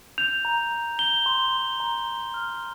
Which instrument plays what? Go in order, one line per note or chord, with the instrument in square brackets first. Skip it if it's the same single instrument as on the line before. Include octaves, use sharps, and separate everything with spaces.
[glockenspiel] G6 F7
A#5
A#5
G6 G7
C6
C6
A#5
A#5
F6